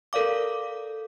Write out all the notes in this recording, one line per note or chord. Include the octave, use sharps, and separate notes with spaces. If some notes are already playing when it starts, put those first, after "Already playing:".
A4 A#4 D5 F5 D6